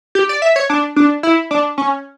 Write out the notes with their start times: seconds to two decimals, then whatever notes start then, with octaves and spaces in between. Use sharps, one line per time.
0.15 G4
0.29 D5
0.42 E5
0.56 C#5
0.70 D4
0.96 D4
1.23 E4
1.51 D4
1.78 C#4